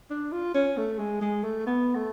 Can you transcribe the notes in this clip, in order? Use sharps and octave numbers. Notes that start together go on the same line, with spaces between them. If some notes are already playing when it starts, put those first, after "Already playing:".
D4
F4
C#4
A3
G#3
G#3
A3
B3
A3